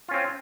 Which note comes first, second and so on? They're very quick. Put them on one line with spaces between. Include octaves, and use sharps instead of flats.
F4 C#4 C4